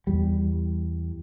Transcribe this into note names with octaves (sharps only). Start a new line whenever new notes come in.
E2 G3